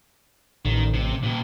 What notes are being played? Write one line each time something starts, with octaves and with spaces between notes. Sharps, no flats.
A1 D#3
C3
A#2 G4